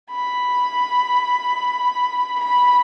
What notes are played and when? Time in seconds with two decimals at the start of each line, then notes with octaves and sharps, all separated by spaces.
0.11 B5
2.39 B5